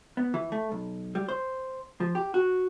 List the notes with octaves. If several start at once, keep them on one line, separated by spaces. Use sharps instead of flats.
B3
E3
A3
B1
G3
C5
F3
G4
F#4